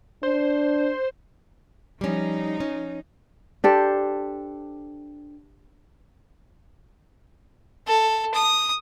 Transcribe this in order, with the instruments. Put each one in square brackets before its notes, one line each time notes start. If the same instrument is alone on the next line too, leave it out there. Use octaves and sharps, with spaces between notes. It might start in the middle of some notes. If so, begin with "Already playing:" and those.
[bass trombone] D4 [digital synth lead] C5
[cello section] F3 D#4 [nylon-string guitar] G3 C#4
[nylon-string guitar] C#4
[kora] D4 G4 A4 C5
[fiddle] A4
D#6